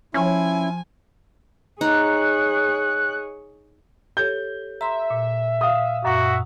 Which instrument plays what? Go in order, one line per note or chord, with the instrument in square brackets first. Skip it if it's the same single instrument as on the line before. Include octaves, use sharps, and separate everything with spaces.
[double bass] F3 [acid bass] C#4 [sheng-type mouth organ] E4 [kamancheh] G#5
[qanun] D#4 [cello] G#4 C#5 [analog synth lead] F#6
[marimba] G4 A4 C#5 [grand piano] G6
[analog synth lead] E5 [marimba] A#5 C6
[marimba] A#2
[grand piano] F5 D#6
[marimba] F#2 A#2 F#5 [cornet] F#4 [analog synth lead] E5